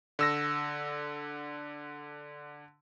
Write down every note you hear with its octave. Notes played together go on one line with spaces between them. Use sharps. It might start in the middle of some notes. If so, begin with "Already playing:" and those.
D3 E6 A#6